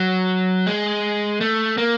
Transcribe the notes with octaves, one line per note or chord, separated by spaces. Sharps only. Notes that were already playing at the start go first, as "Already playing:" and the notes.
Already playing: F#3
G#3
A3
A#3